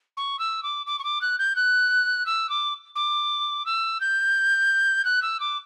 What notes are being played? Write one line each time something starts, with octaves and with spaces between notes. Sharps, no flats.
C#6
E6
D6
D6
C#6
D6
F#6
G6
F#6
E6
D6
D6
E6
G6
F#6
E6
D6